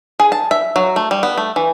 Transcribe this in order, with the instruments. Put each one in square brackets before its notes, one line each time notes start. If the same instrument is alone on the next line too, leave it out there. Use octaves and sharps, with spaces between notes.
[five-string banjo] G#4
A5
E5
F#3
A3
G3
B3
A3
E3